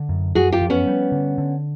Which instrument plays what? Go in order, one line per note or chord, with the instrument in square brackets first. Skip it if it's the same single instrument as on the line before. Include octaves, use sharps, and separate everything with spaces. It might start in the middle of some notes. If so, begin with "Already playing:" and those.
Already playing: [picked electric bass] D3
F#2
[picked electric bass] F#2 [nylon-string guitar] F#4 G#4
[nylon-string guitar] F4 G4
[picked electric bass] F3
[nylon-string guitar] B3 C#4
[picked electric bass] G3
D3
D3